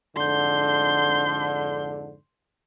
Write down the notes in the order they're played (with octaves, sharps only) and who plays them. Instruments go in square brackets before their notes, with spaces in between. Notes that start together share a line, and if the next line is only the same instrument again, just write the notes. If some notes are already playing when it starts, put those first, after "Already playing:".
[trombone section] F2 G#2 D3 [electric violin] C6 G6